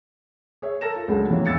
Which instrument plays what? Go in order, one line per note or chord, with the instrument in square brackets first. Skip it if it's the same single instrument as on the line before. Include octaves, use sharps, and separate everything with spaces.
[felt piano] G#4 C#5 E5
A4 A#4 A#6 E7
F4
C#2 F#3 G#3 D4 A4 F#5
C3 E3 A#3 C#4
D2 B2 E6 A6 C#7